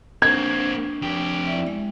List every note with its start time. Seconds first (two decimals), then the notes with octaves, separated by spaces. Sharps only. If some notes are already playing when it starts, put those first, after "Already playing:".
0.22 A#3 C4 D4 C#6 G#6
1.02 F2 G4
1.47 E4 D5 E5
1.67 G#3